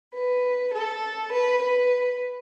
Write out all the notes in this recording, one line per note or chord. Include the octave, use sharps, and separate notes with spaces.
B4
A4
B4
B4